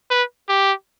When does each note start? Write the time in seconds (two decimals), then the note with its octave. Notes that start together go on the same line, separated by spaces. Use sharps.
0.11 B4
0.49 G4